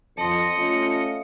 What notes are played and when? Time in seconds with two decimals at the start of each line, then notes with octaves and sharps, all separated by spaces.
0.17 F2 D#5 A5 C6 C#7
0.57 A3 C#4 F4